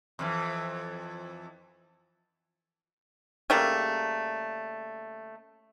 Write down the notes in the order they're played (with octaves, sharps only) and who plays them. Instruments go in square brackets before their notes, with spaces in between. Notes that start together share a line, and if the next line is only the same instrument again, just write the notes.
[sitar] F2 C3 E3
[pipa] C#3 G3 A3 A#3